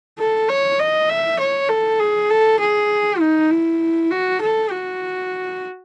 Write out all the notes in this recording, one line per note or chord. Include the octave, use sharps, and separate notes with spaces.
A4
C#5
D#5
E5
C#5
A4
G#4
A4
G#4
D#4
E4
F#4
A4
F#4